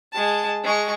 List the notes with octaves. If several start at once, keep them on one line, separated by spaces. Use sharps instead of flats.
G#3 A5
G#3 C#6